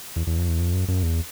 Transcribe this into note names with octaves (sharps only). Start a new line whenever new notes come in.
E2
E2
F2
E2
F2
F#2
F#2
E2